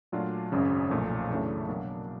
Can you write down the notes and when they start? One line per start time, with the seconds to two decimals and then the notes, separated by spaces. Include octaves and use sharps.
0.12 A#2 F#3 A3 D4 F4
0.52 G#1 F#2 C#3
0.90 B1 A#2 F3 A3
1.29 F#2 C#3 E3 A3 D4
1.68 B2 F#3 A#3 D4